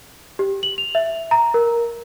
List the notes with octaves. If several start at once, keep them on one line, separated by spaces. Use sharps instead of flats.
G4
F#7
F7
E5
A#5
A#4